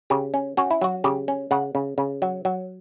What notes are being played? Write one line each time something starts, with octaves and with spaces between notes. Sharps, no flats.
C#3 G4
C#4
C#4 F#4
E4
F#3 F#4
C#3 G4
C#4
C#3 F#5
C#3
C#3
F#3
F#3